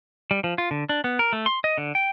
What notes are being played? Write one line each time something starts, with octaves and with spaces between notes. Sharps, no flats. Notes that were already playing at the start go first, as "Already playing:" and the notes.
G3
F3
F4
D3
D4
B3
A#4
A3
C6
D#5
D3
G5